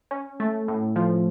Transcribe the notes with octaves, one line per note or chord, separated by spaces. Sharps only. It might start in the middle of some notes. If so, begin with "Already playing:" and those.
C#4
A3
A2
F3